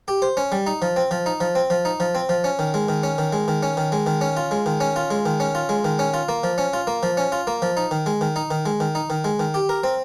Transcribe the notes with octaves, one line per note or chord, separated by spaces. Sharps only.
G4
C5
C#4
G3
D#4
F3
C4
F3
D#4
F3
C4
F3
D#4
F3
C4
F3
C#4
D#3
G#3
D#3
C#4
D#3
G#3
D#3
C#4
D#3
G#3
D#3
C#4
F4
G#3
D#3
C#4
F4
G#3
D#3
C#4
F4
G#3
D#3
C#4
F4
A#3
F3
C#4
F4
A#3
F3
C#4
F4
A#3
F3
D#4
D#3
G#3
D#3
D#4
D#3
G#3
D#3
D#4
D#3
G#3
D#3
G4
A#4
C4